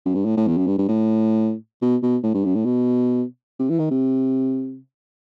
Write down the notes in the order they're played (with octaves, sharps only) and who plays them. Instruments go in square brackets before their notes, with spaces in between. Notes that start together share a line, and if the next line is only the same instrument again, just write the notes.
[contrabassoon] F#2
G2
A2
A2
E2
F#2
G2
G2
A2
B2
B2
A2
G2
F#2
A2
B2
C3
E3
D#3
C3